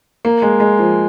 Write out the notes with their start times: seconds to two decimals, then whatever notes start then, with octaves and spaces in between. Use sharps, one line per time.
0.25 A#3
0.42 G#3
0.60 G#3
0.79 F3